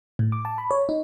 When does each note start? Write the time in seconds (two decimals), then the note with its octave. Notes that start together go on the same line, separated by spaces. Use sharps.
0.19 A2
0.32 D6
0.45 A5
0.58 B5
0.71 C#5
0.89 D#4